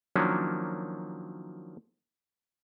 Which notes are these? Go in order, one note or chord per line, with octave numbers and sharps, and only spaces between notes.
D#3 F3 F#3 A#3 C#4 D4